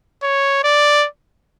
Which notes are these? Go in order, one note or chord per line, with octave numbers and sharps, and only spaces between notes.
C#5
D5